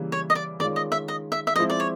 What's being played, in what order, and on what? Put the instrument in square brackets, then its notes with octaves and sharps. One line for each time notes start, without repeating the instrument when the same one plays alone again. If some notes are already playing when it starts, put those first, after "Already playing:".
Already playing: [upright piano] C#3 E3 G3 A#3
[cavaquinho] C#5
D#5
D5
[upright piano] D#3 G#3 C#4 F4 [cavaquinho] D5
[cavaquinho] D#5
E5
D#5
E5
E5
[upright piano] F3 G#3 C4 E4 [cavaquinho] D#5
[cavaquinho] D5
C#5